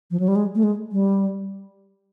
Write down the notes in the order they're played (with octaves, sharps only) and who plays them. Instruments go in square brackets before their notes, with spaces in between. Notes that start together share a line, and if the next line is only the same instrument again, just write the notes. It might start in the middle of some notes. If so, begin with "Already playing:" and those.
[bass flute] F3
F#3
G3
G#3
A3
G#3
G3